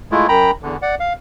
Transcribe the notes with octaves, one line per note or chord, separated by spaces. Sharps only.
G#3 A3 E4 F4
F#2 G5 A#5 B5
E2 D3
D5 F#5
F5